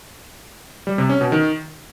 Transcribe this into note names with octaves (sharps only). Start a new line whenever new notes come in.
G3
C3
C#4
B2
D#3